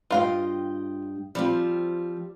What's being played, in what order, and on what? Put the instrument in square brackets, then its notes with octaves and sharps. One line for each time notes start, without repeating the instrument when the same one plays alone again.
[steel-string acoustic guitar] G2 D#5 G5 [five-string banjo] F4 F5
[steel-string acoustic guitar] F3 C4 F4 [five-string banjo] G3